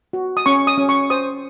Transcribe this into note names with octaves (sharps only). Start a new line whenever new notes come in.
F#4
D#6
C#4 C#6
D#6
C#4
C#6
C5 D#6